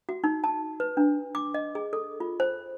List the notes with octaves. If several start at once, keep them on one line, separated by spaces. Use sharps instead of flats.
F#4
D#4
A5
B4
D4
D6
D#5
G#4
A4
F4
C5